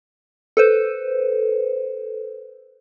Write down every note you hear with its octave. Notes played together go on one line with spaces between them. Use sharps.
A4 B4 C5